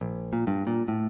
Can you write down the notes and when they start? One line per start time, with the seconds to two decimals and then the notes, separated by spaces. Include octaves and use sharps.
0.01 A#1
0.33 A#2
0.47 G2
0.67 A#2
0.88 A2